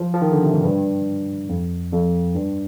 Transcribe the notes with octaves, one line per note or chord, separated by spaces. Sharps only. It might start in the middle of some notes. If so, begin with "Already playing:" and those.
Already playing: F3
F3
D#3
D3
C3
G#2
G2
F2
F2
G2